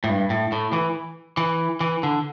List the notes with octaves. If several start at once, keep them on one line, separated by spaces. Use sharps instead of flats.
A2
G2
A2
A2
E3
E3
E3
D3